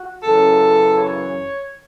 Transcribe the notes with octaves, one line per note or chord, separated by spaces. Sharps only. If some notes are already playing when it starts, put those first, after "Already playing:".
Already playing: F#4
F#2 C#3 E3 A4
C#5